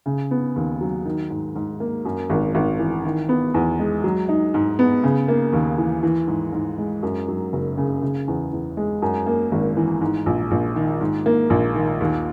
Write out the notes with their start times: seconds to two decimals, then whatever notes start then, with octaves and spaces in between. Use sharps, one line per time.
0.06 C#3
0.31 B3
0.56 D#2
0.81 F#3
1.06 D#3
1.30 G#2
1.55 G#2
1.80 A#3
2.05 F#2
2.30 G#1
2.55 G#1
2.80 E3
3.05 D#3
3.29 B3
3.54 E2
3.79 G#3
4.04 F#3
4.29 D#4
4.54 G#2
4.79 B3
5.04 C#3
5.28 A#3
5.53 D#2
5.78 E3
6.03 E3
6.27 G#2
6.52 G#2
6.78 G#3
7.03 F#2
7.28 F#3
7.53 F#1
7.77 C#3
8.02 C#3
8.28 E2
8.52 E2
8.77 G#3
9.02 F#2
9.26 A#3
9.52 G#1
9.77 E3
10.01 G#2
10.26 A#1
10.51 A#1
10.76 D#3
11.01 G#2
11.26 A#3
11.50 A#1
11.75 D#3
12.00 D#2